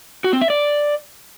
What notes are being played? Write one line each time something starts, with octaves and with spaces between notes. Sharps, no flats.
F#4
C4
E5
D5